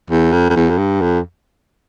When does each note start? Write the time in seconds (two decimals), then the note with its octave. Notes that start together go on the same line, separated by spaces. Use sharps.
0.10 E2
0.33 F2
0.50 F2
0.56 E2
0.70 F2
0.78 G2
1.01 F2